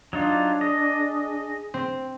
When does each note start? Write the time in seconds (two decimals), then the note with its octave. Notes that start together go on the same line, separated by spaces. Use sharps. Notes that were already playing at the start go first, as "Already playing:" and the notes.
0.13 F#3 D4 D#4 F4
0.61 G#4 D#5
1.74 C4